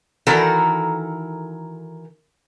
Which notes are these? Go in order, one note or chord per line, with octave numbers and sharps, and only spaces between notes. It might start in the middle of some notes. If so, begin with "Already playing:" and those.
D#3 E3 F#4 A4 A#4